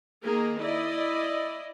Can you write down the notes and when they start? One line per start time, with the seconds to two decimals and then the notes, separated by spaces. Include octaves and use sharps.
0.23 D#3 A#3 G#4 A#4
0.60 E4 D5 D#5